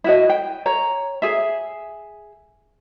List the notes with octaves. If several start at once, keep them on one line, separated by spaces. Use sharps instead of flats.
E4 F#4 D#5
G5
C#5 A#5
G#4 E5